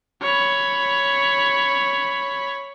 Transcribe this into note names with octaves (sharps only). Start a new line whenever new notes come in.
C#5 B5